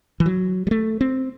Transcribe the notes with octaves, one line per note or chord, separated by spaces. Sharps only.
E3
F#3
G3
A3
C4